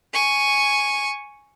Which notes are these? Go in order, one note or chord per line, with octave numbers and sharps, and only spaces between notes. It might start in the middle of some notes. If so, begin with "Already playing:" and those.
G#5 C#6